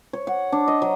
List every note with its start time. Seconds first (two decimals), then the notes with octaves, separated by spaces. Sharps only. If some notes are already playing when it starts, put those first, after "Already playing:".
0.13 C#5
0.27 F#5
0.52 D4
0.68 D#5
0.82 F#3